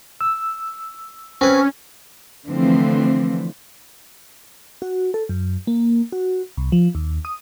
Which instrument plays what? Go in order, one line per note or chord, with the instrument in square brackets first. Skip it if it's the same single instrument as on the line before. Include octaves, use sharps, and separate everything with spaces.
[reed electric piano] E6
[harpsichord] C4 B4 [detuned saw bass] C#4
[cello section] D3 E3 F3 A3 C4
[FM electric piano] F#4
A4
F#2
A#3
F#4
C2
F3
D#2
D#6